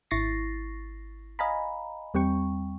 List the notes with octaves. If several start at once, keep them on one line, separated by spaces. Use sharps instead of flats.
G#1 E4 C#6 A6 A#6 C7
D#5 F5 G#5 A#5 B5
E2 G3 C4 G5 C#6